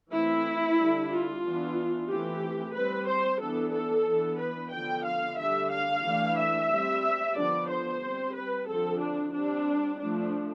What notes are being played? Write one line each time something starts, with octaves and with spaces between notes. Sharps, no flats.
E3 A3 C4 E4
D3 G3 D4
F4
E3 B3 D4
E3 A3 C4 G4
G3 C4 B4
C5
E3 B3 D4 A4
A4
E3 B3 D4
B4
D3 F3 B3 G5
F5
D3 G3 D4 E5
F5
E3 A3 D4
E5
G3 C4
D3 F3 B3 D4 D5
C5
G3 C4
B4
D3 F3 C4 A4
D4
G3 C4 D4
F3 A3 D4